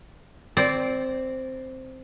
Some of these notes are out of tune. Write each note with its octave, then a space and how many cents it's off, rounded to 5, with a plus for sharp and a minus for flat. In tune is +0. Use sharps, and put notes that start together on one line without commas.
C4 +0 D5 -15